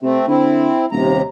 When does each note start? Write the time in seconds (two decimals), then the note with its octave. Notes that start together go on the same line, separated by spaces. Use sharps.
0.02 C3 A3 C4
0.28 D3 C4 E4
0.92 D#1 D#2 C3 A#5